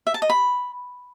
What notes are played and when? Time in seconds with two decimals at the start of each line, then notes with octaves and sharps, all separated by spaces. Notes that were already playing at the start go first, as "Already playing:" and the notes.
0.07 E5
0.14 A5
0.22 D#5
0.30 B5